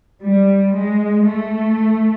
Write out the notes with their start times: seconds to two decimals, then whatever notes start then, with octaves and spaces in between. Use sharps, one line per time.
0.21 G3
0.73 G#3
1.24 A3